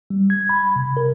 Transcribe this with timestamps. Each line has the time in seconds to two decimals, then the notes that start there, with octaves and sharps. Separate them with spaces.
0.10 G3
0.30 G#6
0.49 B5
0.76 C3
0.97 A#4